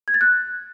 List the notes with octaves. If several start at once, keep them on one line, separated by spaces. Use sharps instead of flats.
G#6
A6
F#6